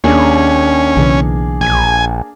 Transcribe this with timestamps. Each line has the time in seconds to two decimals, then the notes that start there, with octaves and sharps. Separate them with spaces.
0.04 D#2 A#3 C#4 D4 G#4
0.97 B1 C#3 E3
1.61 A#1 G#5